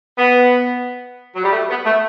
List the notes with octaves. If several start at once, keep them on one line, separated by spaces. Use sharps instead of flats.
B3
F#3
G3
A3
B3
A3